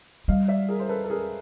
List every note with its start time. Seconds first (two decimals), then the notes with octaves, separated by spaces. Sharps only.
0.28 G3 D#5 F5
0.48 D5 E5
0.68 G#4 A#4
0.80 C5
0.89 A4 B4
1.04 A4
1.10 G#4 A#4